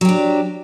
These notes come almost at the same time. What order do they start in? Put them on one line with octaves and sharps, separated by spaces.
F#3 G4 D4